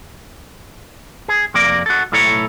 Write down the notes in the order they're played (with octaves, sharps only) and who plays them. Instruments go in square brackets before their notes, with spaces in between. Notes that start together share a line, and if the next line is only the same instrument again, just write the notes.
[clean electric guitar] G#4
F2 C3 A#3 A#4 D5
F#4 A4
B1 A2 E4 A4 C#5 A#5